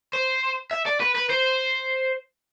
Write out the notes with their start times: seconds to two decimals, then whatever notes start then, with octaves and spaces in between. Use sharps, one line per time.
0.13 C5
0.71 E5
0.86 D5
1.00 B4
1.15 B4
1.29 C5